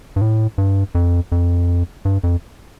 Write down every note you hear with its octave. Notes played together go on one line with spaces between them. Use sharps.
G2
A2
G2
F2
F2
G2
F2